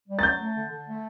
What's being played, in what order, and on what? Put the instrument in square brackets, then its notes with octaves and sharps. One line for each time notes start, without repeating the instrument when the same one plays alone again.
[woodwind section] G3
[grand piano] A6
[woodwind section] F#3 [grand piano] G6
[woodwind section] A3
D3
D3
A3